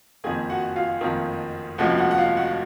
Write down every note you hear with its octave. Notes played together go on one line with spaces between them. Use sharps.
F#1 F2 D#3 G#4 G#5
F#4 F#5
F4 F5
F#1 F2 D#3
F1 D#2 C#3 F3 G#3 F#4 F#5
F#4 F#5
F#5
F4 F5
F#4 F#5